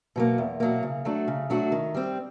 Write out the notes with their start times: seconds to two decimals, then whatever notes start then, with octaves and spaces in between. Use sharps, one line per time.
0.16 B2 F#3 A#3
0.38 E2
0.60 B2 F#3 A#3
0.83 C#3
1.05 F#3 A3 D4 F#4
1.28 C#3
1.50 F#3 A3 D4 F#4
1.72 D#3
1.94 G3 C4